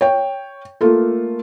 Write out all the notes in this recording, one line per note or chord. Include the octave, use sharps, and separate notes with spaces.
C#5 G5
A3 A#3 F4 A4